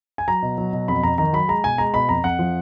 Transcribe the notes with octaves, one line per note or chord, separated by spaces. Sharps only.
G#5
F#3 A#5
B2
F#3
B2
F2 B5
F2 A#5
D#3 A#5
F#3 B5
G#3 A#5
B2 G#5
G#3 A#5
B2 B5
F2 A#5
F2 F#5
F3